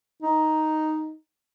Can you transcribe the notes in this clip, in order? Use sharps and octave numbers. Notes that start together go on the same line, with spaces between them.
D#4